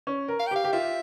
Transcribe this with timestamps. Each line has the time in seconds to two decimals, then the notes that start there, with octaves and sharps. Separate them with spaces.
0.07 C#4
0.28 A#4
0.39 F5
0.47 G5
0.51 G4
0.56 F5
0.64 G4
0.73 F4 E5